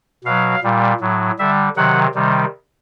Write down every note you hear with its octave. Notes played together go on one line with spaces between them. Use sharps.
B2 F#3 F5
A#2 G3
A2 F#3
D3 G3 E5
C3 D#3 F#3 F#5
C3 D#3 G3